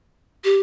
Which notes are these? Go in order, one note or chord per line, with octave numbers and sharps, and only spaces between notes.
G4